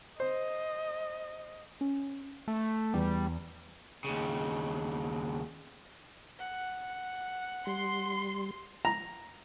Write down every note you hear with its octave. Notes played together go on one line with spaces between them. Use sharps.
C5 D#5
C#4
A3
E2 G3
D#2 C#3
F#5
G3 C6
A#5